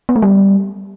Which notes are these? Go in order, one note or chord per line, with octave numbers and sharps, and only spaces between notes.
B3
A3
G3